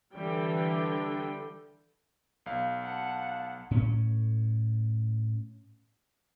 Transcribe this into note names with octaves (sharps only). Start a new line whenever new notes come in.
D3 E3 G3 G5
B1 F5
F#5 A5
A2 C#4